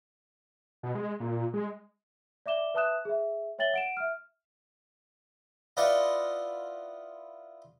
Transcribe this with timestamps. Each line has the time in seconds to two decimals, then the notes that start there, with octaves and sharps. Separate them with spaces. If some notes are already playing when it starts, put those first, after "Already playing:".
0.83 B2
0.95 G#3
1.20 A#2
1.54 G#3
2.46 D5 E5 D6 E7 G7
2.74 B4 E5 A5 D#6 F#6 E7
3.05 G#4 E5
3.59 C#5 E5 G5 A6 F#7 G7
3.74 F#5 D7 E7
3.97 E5 F6
5.77 E4 F4 B4 D5 D#5 F#5